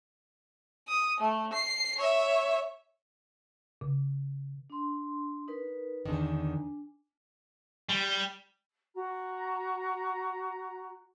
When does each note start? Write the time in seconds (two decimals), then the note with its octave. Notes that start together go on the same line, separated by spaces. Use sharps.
0.88 D#6
1.20 A3
1.53 C7
1.97 C#5 E5
3.81 C#3
4.70 D4 C6
5.48 D#4 A#4 B4
6.06 E2 D3 D#3 D4 G#5
7.89 G3
8.95 F#4 A#5